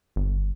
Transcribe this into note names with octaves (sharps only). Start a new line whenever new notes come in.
G1